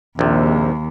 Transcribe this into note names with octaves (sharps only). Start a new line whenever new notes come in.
A#1 D#2 C3